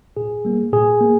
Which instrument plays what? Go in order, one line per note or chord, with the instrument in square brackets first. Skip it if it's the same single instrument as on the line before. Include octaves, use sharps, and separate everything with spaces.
[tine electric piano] A#2 G#4
G3 A#3
A#2 G#4
A#3